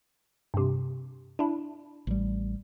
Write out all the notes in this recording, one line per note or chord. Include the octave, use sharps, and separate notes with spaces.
G2 C3
D4 E4
A1 G3